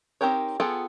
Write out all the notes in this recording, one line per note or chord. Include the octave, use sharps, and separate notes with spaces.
C4 D#4 G4 A#4 C#5
B3 F4 G#4 A4 G5